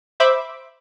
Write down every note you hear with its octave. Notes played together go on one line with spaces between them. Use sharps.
C5 E5 B5 D6